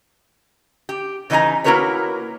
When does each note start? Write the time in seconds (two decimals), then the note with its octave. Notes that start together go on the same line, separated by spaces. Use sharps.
0.89 G4
1.30 C#3 E3 D#4 E4 G#5 A#5
1.64 A#3 E4 F#4 A#4 B4 C#5